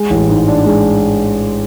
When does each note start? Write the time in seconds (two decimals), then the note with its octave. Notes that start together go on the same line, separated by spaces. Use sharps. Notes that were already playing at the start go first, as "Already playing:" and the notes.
Already playing: G#3
0.10 A1
0.29 G#2
0.48 D4
0.66 G#3